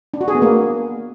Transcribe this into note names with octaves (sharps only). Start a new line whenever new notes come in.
D4
F#4
G#4
B3
A#3